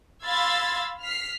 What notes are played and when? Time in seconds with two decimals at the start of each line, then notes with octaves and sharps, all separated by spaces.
0.24 F5 B5 C6 E6 G#6 A6
1.03 F6 B6 C7